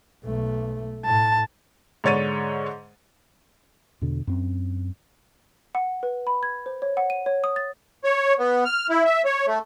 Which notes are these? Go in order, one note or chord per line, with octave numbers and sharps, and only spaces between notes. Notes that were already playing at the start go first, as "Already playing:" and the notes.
B1 A3
A2 A5
G#2 D3 C#5 A6 D#7
E2 B2 D3 D4
F#2 C4
F#5
B4
B5
G#6
C5
C#5
F#5
D#7
C#5
D#6
A6
C#5
B3
F6
E4
E5
C#5
A3